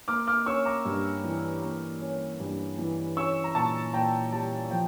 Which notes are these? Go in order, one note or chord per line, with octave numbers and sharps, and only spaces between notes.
A#3 D6 F6
D6 F6
C#4 C#6 E6
A#5 D6
G2
E3
A#3
C#4
G2
E3
C#4 C#6 E6
A#5
A#2 A5 C#6
A#2 G5 A#5
G3 A5
F3 G5